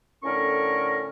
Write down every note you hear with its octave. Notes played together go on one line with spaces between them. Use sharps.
A2 D3 C#4 A4 A#4 C#6